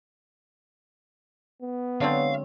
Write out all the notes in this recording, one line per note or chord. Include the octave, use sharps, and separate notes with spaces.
B3
D3 F#3 G#3 C4 C#5 F5